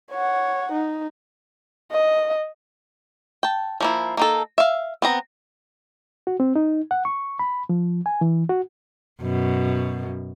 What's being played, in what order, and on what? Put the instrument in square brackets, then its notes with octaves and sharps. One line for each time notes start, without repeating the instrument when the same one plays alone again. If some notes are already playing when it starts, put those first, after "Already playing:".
[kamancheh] C#5 F#5
D#4
D#5
[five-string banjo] G5 A5
F3 A#3 E4
A#3 D#4 A4
E5 F5
B3 C4 A#5
[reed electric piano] F#4
C4
D#4
F#5
C#6
B5
F3
G#5
E3
F#4
[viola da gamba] F#2 B2